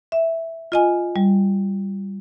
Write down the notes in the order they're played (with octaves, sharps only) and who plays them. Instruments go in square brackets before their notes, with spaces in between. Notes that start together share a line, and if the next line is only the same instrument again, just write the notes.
[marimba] E5
F4 D#5 G#5
G3